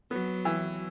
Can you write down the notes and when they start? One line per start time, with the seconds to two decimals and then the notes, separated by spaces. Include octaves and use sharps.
0.11 F#3 B3
0.45 E3